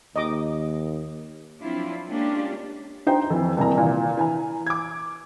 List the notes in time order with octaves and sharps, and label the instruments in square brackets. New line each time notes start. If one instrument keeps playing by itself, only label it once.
[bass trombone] D#2 [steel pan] D#5 D6
[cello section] F3 F#3 C4 D4 E4 F4
G#3 A#3 C#4 D4 F4 G4
[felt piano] D#4 C5 G5
F2 E3
D#1 C3 E3 A#5
A#2 E3
E3 G#5 A#5
D6 G#6